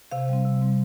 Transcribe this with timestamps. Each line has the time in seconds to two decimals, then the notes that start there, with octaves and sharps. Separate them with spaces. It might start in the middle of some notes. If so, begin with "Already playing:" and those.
0.11 C3 F5
0.29 G3 C4
0.45 C3
0.62 G3 C4